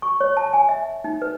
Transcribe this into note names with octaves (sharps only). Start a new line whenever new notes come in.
C#6
C#5
A5
G#5
E5
D#4
B4